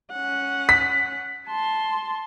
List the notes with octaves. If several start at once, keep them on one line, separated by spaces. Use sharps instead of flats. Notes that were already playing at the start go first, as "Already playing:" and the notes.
C#4 F#5
B6
A5 C6